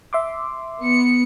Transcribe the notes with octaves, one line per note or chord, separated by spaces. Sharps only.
E5 C6 D6
B3 C#7